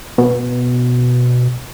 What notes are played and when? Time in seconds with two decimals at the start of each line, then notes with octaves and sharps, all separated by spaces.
0.18 B2